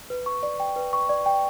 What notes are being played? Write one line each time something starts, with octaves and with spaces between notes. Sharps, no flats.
B4
C#6
D5
G5
B4
C#6
D5
G5